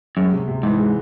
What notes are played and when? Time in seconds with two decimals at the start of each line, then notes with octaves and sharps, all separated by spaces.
0.17 F#2 G#3
0.32 C3
0.48 C3
0.63 G#2 E3
0.79 G#3